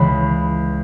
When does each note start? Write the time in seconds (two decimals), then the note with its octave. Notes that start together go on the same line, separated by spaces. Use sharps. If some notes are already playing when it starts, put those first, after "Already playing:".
Already playing: C#2 C#3 E3 B5